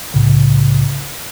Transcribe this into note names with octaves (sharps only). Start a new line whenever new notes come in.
C2 A2 C#3